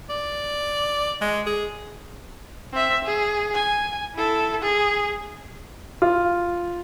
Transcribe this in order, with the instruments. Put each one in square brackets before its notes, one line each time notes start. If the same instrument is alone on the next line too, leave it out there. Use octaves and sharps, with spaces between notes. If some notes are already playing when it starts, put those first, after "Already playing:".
[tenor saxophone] D5
G#3
G#4
[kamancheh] C4 E5
G#4
G#5
E4 A4
G#4
[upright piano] F4